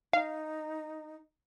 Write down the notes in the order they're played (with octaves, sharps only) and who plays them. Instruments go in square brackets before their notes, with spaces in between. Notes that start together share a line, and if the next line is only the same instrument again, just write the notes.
[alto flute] D#4 [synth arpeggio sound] F5